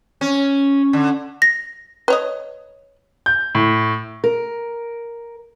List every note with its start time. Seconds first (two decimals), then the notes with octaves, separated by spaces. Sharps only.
0.21 C#4
0.93 D3
1.42 A#6
2.08 B4 C#5 D#5
3.26 G6
3.55 A2
4.24 A#4